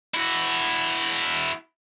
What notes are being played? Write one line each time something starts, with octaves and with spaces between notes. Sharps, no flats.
E4 F#4